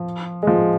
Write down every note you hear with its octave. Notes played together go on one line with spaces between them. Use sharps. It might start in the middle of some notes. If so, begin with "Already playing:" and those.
Already playing: F3
G#3
F3